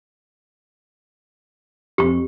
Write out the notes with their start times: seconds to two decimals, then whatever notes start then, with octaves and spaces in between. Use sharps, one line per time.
1.98 F2 C4 G4 C#6